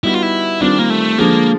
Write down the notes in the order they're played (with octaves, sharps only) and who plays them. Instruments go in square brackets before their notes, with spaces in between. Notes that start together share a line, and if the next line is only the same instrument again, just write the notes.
[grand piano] G3 B3 D#4 F#4 [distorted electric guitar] E4
[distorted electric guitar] F4
E4
[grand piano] D#3 G3 C4 F4 [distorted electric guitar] D4
[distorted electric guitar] A#3
A3
[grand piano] D3 F3 G#3 [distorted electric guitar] A#3